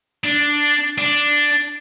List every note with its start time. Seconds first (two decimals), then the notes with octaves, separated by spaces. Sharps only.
0.24 D4
0.98 D4